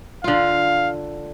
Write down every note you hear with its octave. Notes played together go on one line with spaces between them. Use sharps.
D3 F4 F5